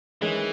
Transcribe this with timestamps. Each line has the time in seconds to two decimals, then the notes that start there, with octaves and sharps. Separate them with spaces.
0.22 D#3 E3 G#3 C#4